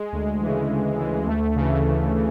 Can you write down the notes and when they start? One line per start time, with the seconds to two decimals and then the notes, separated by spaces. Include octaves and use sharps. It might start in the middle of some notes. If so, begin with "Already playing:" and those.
Already playing: G#3
0.12 D2
0.41 C#3 E3
0.70 D2
0.99 C#3 E3
1.27 D2 A3
1.56 C#3 E3
1.84 D2
2.13 C#3 E3